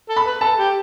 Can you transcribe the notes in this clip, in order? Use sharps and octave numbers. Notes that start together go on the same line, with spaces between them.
A4
B5
B4
A4 A5
G4